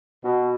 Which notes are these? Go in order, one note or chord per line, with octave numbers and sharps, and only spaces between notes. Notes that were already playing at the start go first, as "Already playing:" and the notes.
B2